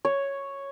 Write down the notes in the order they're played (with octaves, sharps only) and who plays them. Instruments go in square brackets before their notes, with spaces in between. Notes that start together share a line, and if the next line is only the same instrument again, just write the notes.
[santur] C#5